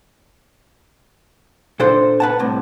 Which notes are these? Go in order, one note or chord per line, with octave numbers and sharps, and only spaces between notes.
A#2 D4 A4 C5
B4 F#5 A5
C2 A2 C3